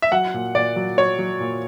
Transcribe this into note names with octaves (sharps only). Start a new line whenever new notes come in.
E5
F#3 F#5
A#2
A#2 D5
F#3
F#3 C#5
F#3
A#2